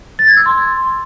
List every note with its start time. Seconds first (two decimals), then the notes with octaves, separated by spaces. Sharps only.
0.19 A6
0.28 G#6
0.37 E6
0.46 C6